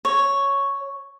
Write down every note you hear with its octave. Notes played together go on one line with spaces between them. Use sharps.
C#5